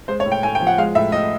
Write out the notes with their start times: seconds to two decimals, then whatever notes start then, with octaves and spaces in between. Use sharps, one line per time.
0.08 G#3 C5
0.20 C#5
0.26 A2
0.32 G5
0.43 A2 G#5
0.55 G5
0.60 F3
0.67 F#5
0.78 G#3 F5
0.95 A2 E5
1.12 A2 D#5